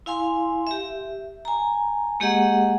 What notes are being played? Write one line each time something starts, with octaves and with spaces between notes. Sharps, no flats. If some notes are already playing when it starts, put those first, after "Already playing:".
E4 F5 G#5 C6
G4 E5
G#5 A#5
G#3 A#3 G4 G#4 D#5 F#5